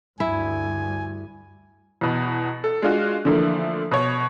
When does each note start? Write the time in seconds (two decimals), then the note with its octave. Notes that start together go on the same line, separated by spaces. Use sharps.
0.20 D2 G2 E4 G#5
2.01 E2 B2
2.64 A4
2.82 G#3 D4 F4 F#4
3.25 D3 E3 F3 A3 A#3
3.91 B2 C#5